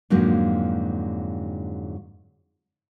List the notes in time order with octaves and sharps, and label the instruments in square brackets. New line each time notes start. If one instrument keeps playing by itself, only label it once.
[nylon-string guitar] F2 G#2 D3 F#3 G#3 A#3